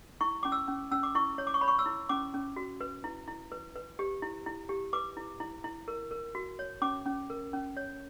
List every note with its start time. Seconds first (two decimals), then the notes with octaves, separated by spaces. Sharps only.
0.21 E4 C#6
0.43 C#4 D6
0.52 E6
0.68 C#4
0.91 C#4 E6
1.03 D6
1.15 E4 C#6
1.38 C#5
1.47 D6
1.54 C#6
1.61 C#5 B5
1.68 C#6
1.79 E6
1.86 E4
2.09 C#4 D6
2.34 C#4
2.56 F#4
2.81 B4
3.04 E4
3.28 E4
3.52 B4
3.76 B4
3.99 G4
4.22 E4
4.46 E4
4.69 G4
4.93 B4 D6
5.17 E4
5.40 E4
5.64 E4
5.88 A#4
6.11 A#4
6.35 F#4
6.59 C#5
6.82 C#4 D6
7.06 C#4
7.30 A#4
7.53 C#4
7.77 C#5